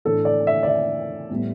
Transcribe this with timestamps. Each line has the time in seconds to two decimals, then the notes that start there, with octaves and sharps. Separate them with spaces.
0.05 A2 E3 A3 D4 A4
0.25 D5
0.47 E5
0.63 D5
0.68 E5
1.30 A2 G3 B3